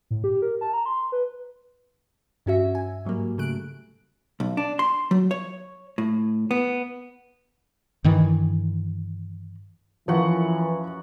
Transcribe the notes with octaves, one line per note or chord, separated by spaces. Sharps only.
A2
G4
A#4
A5
A#5
C6
B4
G2 C#4 F#4 E5
G#5
G#2 F#3 G3 A#3
C#3 F#3 A3 F#6 D7
B1
D4
C6
F#3
C#5
A2
B3
G2 D#3 E3
F#2 E3 F3 F#4 F#5